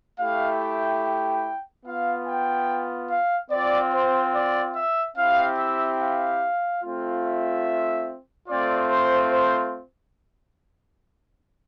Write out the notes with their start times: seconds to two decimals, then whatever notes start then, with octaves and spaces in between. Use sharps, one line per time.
0.19 A3 E4 G4 F5
0.61 G5
1.03 G5
1.85 B3 F4 F5
2.27 G5
3.10 F5
3.51 C4 F4 D5
3.93 C5
4.35 D5
4.76 E5
5.17 C4 E4 G4 F5
5.58 E5
5.99 F5
6.83 A3 C4 F4
7.24 E5
8.49 A3 C4 F4 D5
8.89 C5
9.31 C5